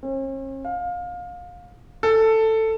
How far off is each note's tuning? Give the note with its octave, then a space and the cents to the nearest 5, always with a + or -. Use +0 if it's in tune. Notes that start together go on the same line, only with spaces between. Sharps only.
C#4 -45
F5 +25
A4 +10